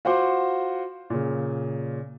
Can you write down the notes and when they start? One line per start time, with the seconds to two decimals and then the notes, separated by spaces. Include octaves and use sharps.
0.05 F4 F#4 C5 F#5 C6 D6
1.10 A#2 C#3